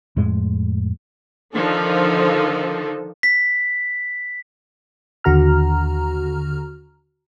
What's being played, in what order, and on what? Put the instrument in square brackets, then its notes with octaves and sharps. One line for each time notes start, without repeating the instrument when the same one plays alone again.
[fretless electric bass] F2 A2 G#3
[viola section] D3 D#3 F3 D4 D#4 A4
[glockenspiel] B6
[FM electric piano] D#2 D3 F#4 A#5 F6